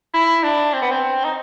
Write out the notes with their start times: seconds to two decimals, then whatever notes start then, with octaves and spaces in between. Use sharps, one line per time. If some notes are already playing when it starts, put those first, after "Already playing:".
0.14 E4
0.44 D4
0.73 C4
0.82 B3
0.91 C4
1.24 D#4